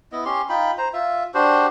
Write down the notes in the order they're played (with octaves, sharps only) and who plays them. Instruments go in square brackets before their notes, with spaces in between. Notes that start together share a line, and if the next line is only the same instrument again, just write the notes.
[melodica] B3 E4 D#5
C#4 G4 C6
D#4 F4 G5 B5
C5 A#5
F4 E5
D4 F#4 G4 C5